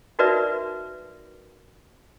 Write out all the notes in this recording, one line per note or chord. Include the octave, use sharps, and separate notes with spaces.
D#4 F#4 A#4 B4 D5 E5